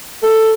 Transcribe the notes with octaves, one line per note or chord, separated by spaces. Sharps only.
A4